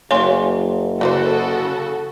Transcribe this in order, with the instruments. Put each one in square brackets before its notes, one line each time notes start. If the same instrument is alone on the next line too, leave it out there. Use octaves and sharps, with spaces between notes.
[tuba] F#1 [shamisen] F#3 A#3 [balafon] C#5 G#5 C6
[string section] C#3 F#4 A4 [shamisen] E3 F#3 C5